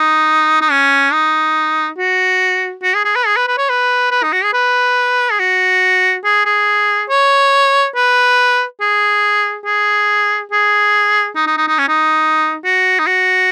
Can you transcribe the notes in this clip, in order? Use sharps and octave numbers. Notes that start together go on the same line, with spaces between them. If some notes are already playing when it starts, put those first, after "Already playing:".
Already playing: D#4
D#4
C#4
D#4
F#4
F#4
G#4
G#4
B4
G#4
B4
B4
C#5
B4
B4
D#4
F#4
G#4
B4
G#4
F#4
G#4
G#4
C#5
B4
G#4
G#4
G#4
D#4
D#4
D#4
D#4
C#4
D#4
F#4
D#4
F#4